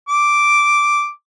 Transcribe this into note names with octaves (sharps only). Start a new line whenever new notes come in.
D6